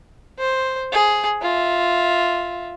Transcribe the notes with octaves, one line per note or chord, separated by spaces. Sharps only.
C5
G#4
F4 E5